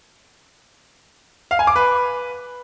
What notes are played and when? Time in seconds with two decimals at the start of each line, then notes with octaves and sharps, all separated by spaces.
1.51 F5
1.59 G#5
1.67 D6
1.76 B4